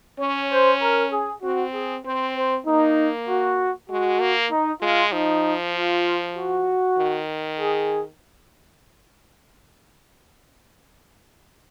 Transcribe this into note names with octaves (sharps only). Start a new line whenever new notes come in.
C#4 C#5
C5
A#4
G#4
C4 F#4
G#4
C4 C5
C5
A#3 D#4
F#4
G#3 F#4
A#3
D#4
G#3 F4
F3 D#4
F4
F#4
D#3
G#4